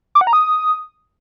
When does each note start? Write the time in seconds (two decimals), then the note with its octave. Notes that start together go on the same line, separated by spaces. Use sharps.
0.15 D6
0.21 F#5
0.27 A#5
0.33 D#6